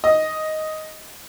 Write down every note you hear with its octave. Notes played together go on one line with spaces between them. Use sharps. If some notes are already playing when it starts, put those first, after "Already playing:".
D#5